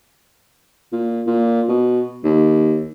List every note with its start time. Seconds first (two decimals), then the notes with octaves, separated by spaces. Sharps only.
0.92 A#2
1.27 A#2
1.69 B2
2.24 D#2